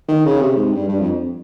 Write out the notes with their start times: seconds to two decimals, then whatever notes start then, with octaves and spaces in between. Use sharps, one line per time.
0.08 D#3
0.25 C#3
0.41 C3
0.56 G#2
0.73 G2
0.89 G2
0.99 F2